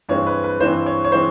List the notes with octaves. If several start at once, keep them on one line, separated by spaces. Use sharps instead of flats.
G2 E3 G#3 C4 C#5
B4
B4
G2 E3 G#3 C4 C5
C#5
C#5
E3 G#3 C4 C5